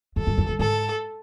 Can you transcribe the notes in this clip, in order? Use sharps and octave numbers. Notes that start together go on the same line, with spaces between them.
F#2 A4
G2
F#2
G2
G#2 A4